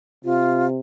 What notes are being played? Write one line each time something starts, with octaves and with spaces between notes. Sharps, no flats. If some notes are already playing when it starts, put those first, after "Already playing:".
C3 F4